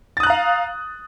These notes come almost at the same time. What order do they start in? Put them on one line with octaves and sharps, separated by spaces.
A6 D#6 F#6 A#5 F5